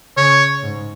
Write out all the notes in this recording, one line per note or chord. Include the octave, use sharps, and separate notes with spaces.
C#3 C#5
G#2